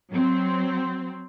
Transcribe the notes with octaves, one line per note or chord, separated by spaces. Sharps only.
F#3 C4